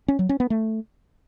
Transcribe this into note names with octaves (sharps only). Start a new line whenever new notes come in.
C#4
F#3
C#4
B3
A3